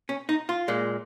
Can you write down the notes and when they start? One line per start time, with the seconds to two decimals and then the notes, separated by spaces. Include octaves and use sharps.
0.09 C#4
0.29 D#4
0.49 F4
0.68 A#2 G#3